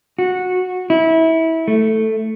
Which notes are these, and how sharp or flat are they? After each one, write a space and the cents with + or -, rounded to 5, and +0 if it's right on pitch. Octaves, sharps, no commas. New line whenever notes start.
F#4 -15
E4 -25
A3 +5